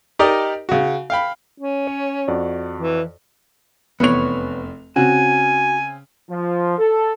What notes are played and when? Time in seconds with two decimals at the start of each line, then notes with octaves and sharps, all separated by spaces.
0.19 D#4 G4 A#4 D5 D#5
0.69 C#3 F#4
1.10 F5 G5 B5
1.60 C#4
1.87 C#5
2.28 F2 F#4 D5
2.78 E3
4.00 F1 E2 B3 C#5 F7
4.96 C#3 C4 F#4 G#5
6.30 F3
6.78 A4